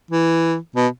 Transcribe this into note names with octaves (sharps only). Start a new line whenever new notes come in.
E3
B2